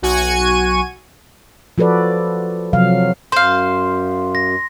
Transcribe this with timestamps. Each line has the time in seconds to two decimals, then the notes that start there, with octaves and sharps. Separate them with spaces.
0.02 B1 F#4 G#5 C#6 G#6 D#7
1.78 F3 F#4 A4 B4 D5
2.73 C3 F3 F#3 F5
3.32 F#2 C5 F5 C6
4.35 A#6